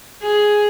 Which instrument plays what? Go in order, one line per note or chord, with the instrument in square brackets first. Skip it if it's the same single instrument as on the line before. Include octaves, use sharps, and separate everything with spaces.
[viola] G#4